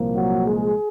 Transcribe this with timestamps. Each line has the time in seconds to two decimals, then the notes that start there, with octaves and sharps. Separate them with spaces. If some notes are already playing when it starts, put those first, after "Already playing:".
Already playing: C2 A#2 F3 A#3
0.15 F#3 F#4
0.45 G#3 G#4